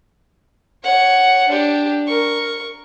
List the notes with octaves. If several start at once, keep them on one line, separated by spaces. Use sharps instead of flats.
C#5 F#5
D4 G4
A#4 C#6